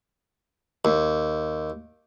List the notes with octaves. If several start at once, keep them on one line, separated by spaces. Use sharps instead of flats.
D#2